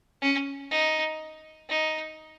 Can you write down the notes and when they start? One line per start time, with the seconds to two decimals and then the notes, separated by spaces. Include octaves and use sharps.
0.22 C#4
0.71 D#4
1.69 D#4